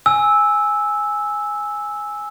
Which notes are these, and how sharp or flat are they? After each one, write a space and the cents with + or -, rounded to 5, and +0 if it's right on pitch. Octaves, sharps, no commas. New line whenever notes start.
G#5 +0 E6 -10